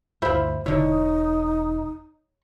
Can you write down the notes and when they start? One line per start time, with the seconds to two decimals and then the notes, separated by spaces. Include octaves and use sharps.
0.22 D2 G2 E4 F4 C5 E5 B5
0.66 E1 D3 D#4 E4 C#5